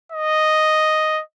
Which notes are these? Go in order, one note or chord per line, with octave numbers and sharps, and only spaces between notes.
D#5